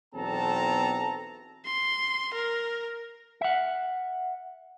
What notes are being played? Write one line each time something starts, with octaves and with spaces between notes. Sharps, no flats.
B1 E2 C4 A4 A5 A#5
C6
A#4
E5 F#5